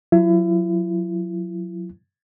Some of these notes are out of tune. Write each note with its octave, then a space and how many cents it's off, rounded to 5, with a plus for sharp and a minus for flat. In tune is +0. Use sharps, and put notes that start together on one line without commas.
F#3 -25 E4 +35